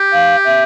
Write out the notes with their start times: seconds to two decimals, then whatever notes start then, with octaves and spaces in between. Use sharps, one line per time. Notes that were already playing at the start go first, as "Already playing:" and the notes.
Already playing: G4
0.12 F5
0.45 E5